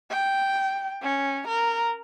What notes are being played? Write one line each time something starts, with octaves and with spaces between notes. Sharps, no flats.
G5
C#4
A#4